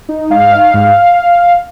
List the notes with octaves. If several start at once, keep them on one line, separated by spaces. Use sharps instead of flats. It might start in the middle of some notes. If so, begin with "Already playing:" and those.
D#4
G#2 F5
D#4
G#2